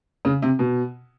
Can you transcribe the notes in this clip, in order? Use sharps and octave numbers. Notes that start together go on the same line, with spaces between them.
C#3
C3
B2